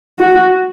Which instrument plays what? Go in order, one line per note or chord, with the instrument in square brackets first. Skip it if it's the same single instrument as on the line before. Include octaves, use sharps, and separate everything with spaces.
[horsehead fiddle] F#4